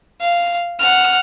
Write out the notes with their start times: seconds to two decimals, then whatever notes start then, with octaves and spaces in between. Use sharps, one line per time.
0.21 F5
0.80 F#5 F6